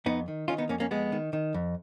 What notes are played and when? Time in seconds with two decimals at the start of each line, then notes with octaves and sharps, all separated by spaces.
0.06 F2 B3 D#4
0.28 D#3
0.48 D#3 C#4 F4
0.58 B3 D#4
0.69 F2 A#3 C#4
0.80 A#3 C#4
0.91 F2 G#3 B3
1.12 D#3
1.33 D#3
1.54 F2